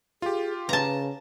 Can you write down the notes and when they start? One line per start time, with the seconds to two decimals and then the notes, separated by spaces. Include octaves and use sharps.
0.22 F4 G4 G#4
0.69 C#3 B4 A5 A#5